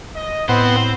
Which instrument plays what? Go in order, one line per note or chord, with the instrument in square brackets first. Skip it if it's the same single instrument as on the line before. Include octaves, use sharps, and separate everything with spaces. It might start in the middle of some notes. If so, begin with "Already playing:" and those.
[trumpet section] D#5
[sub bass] A2 [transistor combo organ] B3 [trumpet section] C4 [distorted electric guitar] C5